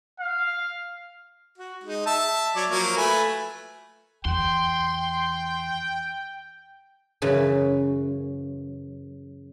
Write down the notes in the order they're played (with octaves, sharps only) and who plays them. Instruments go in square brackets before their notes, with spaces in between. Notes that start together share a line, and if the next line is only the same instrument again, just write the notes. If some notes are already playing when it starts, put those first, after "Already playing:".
[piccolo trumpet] F5
[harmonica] F#4
G#3 D#4
E5 A5
F#3 C#5 D5
F3 F#3 A#3
A3 B4 G#5
[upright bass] E2 [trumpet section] G5 [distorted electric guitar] C6
[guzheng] F#2 C#3 E3